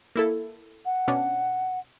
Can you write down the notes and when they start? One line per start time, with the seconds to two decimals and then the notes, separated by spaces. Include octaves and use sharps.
0.16 A#3 E4 A4
0.86 F#5
1.08 B2 C#4 D4